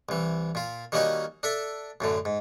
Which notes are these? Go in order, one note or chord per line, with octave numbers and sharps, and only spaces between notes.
C2 E3
A#2 F4
D#3 G3 A#3 C#4 D#4 F#4
D4 A4 E5
F#2 A2 D3
G#2